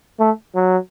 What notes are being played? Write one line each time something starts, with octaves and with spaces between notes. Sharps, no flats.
A3
F#3